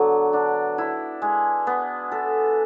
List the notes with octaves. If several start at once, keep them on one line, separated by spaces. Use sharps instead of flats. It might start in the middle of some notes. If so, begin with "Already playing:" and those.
Already playing: D3 F#3 B3
D4
E4
G#3
B3
A4